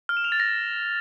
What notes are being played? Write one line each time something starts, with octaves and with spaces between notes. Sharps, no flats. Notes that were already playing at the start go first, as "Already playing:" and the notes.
F6
E7
F7
A6
A#6